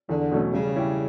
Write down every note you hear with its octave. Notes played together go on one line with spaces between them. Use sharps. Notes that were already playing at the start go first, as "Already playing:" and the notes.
E2 D3
B2 F#3 A3 C#4
C#3 G3
C#4 E4 G4